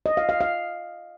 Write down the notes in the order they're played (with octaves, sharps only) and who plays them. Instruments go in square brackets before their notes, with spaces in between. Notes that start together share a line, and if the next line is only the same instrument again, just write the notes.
[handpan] D#5
F5
F5
F5